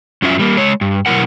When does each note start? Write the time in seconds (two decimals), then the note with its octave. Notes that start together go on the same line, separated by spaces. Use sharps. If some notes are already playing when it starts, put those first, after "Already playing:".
0.22 F#2 F#3 C#4 F4 E5
0.39 G3 A#3
0.57 G#3 C#5
0.81 G2
1.06 B2 F#3 G3 E4 A#4 F#5